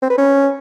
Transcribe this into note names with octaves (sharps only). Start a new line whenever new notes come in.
C4
B4
C#4